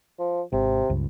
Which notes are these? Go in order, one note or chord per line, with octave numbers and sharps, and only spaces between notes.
F3
G#1 C3
C#2 G2